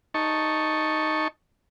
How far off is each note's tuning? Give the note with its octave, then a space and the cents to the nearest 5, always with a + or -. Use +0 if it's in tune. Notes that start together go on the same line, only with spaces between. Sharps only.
D#4 +0 A5 +0 C#6 +0